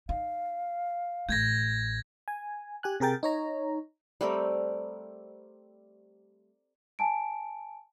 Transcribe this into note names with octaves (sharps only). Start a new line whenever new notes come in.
D#4 F5
A1 A3 G6 G#6 A#6
G#5
G4 G#5 F#6
C3 G#4 A#4 G5 A6
D#4 C#5 A#5
G3 A3 C4 A#4
G#5 A5 D7